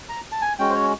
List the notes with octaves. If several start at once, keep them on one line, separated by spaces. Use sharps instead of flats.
A#5
A5
G#5
G#3 C#4 F#4 G5
C5
C#5